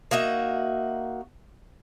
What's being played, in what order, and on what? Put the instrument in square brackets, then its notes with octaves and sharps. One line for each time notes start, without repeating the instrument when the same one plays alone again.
[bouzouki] A#3 D#4 F#4 E5